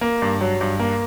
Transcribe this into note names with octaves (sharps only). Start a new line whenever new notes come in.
A#3
G2
F#3
G2
A#3